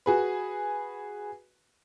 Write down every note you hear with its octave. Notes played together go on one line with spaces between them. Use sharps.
F#4 G#4 B4